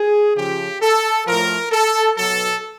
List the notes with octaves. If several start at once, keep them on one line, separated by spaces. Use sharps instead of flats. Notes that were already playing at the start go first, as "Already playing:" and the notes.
Already playing: G#4
C#3 F3 G4
A4
A2 F3 A#4
A4
B2 F#3 A4